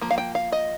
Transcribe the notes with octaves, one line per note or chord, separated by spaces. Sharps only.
F3 A#3
F5
G5
F5
D#5